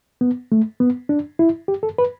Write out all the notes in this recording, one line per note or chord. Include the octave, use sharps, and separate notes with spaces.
B3
A3
B3
D4
E4
G4
A4
B4